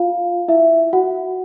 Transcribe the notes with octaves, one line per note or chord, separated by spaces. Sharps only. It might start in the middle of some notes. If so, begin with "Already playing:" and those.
Already playing: F4 F5
E4 E5
F#4 F#5